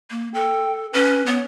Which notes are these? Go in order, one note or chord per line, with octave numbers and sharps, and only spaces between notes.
A#3
A4 G5
C#4 B4
B3 C#5